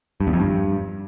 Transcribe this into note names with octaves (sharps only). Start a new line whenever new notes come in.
G2
E2
F2
G2